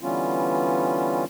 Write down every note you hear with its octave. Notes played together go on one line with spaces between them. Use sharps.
D3 E3 G3 B3 C#4 F4